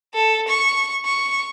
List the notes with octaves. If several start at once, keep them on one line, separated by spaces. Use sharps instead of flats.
A4
C#6
C#6